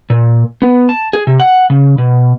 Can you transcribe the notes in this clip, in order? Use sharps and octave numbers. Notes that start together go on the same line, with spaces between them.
A#2
B3
A5
G#4
C3
F#5
C#3
B2